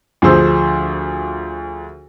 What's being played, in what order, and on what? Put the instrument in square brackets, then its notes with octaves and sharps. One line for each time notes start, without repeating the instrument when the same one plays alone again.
[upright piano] D2 F3 G#4 C5 E6